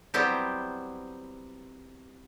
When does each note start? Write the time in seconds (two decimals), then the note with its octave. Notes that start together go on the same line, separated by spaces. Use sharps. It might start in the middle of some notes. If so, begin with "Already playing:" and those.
0.14 F#3 G3 B3 C4 E4 G4